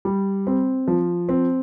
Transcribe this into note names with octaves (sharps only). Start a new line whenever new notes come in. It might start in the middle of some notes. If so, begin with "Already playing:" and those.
G3
C4
F3
C4